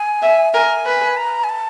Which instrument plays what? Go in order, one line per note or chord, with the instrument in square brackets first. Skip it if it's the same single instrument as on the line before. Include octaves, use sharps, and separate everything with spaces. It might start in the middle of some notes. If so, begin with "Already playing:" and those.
Already playing: [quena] G#5
[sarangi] E5
[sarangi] A#4 [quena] G#5
[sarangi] B4
[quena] A#5
G#5
A5